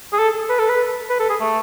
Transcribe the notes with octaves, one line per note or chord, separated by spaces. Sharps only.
G#4
A4
B4
A4
B4
B4
A4
G#4
A3